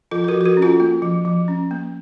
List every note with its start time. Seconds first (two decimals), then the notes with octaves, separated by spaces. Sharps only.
0.11 F3 F4 A4
0.24 A4
0.28 F#4 A#4
0.34 F3
0.41 A4
0.45 F#4 A#4
0.57 C#4
0.62 F4 A4
0.80 A#3 F4
1.02 F3
1.25 F3
1.48 C#4
1.71 A#3